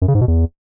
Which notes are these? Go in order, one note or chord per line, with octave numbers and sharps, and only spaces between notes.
F#2
C#3
G#2
B2
E2